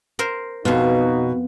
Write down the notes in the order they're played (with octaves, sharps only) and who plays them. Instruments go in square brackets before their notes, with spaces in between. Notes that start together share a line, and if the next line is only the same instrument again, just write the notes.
[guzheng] A#4 C5
[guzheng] F2 F4 [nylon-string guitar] B2 [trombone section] D#4 F#4